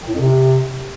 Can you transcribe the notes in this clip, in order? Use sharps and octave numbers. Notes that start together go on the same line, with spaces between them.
D#3
A2
F2
C3